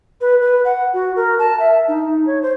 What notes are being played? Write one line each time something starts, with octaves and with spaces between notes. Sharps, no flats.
B4
B4
F#5
F#4
A#4
A5
E5
D#4
C#5
C5